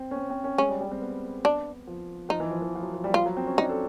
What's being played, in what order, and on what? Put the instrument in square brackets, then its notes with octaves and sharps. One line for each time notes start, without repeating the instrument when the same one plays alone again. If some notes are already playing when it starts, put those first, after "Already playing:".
Already playing: [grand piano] C4
C#4
C4
C4
C#4
[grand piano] G#3 [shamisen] C#4
[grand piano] G3
G3
C4
B3
[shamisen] D4
[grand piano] F3
[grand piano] F3 [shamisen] D#4
[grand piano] E3
F3
E3
F3
F#3
F3
G3
[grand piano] F3 [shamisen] F4
[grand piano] F#3
C4
C#4
[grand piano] D4 [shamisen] D#4
[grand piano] A4